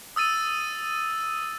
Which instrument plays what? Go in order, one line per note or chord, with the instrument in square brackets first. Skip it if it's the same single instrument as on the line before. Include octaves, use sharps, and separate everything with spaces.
[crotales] D#6 E6 A6 D#7